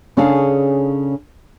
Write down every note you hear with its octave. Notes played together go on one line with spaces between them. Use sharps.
C#3 C#4 D4 G#4 A4 F5